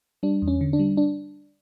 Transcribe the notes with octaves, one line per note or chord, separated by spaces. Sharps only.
G3 D4
E2
C#4
D3
D4
G3
D4